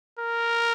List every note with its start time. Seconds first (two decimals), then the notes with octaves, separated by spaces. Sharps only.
0.19 A#4